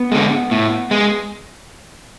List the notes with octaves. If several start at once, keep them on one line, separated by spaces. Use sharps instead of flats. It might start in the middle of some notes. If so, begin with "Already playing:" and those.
Already playing: B3
D3 G#3
A2
G#3